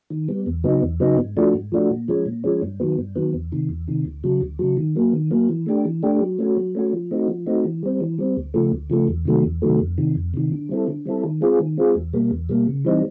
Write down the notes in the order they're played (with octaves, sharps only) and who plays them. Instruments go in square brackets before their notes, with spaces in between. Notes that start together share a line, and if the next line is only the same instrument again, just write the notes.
[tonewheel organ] D#3
G3 B3
E2
C#3 F#3 B3 D#4
E2
C#3 F#3 B3 D#4
G#2
F3 A3 D4 F#4
G#2
F3 A3 D4 F#4
A#2
F3 G#3 C#4
A#2
F3 G#3 C#4
G2
D#3 F#3 B3
G2
D#3 F#3 B3
E2
C3 D#3
E2
C3 D#3
D2
C#3 F#3
D2
C#3 F#3
D#3
F#3 A#3
D#3
F#3 A#3
E3
A3 D4 G4
E3
A3 D4 G4
F#3
A3 C#4 F#4
F#3
A3 C#4 F#4
F3
A3 C4 D#4 F#4
F3
A3 C4 D#4 F#4
E3
G3 C4
E3
G3 C4
D2
C#3 F3 A3
D2
C#3 F3 A3
E2
C3 D#3 F#3 A3
E2
C3 D#3 F#3 A3
F2
C3 D#3
F2
C3 D#3
D3
G3 C4 E4 A4
D3
G3 C4 E4 A4
D#3
G#3 C4 F4 G#4
D#3
G#3 C4 F4 G#4
E2
B2 G3 A#3
E2
B2 G3 A#3
C#3
E3 G3 C4 D#4